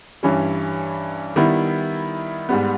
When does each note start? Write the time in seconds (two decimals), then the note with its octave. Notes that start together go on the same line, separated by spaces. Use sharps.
0.23 G2 E3 G3 C#4
1.36 D#3 G3 B3 E4
2.49 G#2 G3 B3